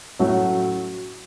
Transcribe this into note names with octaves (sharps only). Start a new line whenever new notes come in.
A2 F#3 A3 C#4 F#4